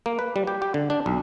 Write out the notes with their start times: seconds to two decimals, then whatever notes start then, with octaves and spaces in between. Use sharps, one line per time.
0.06 A#3
0.19 B4
0.36 G3
0.47 G4
0.62 G4
0.74 D3
0.90 D4
1.06 B1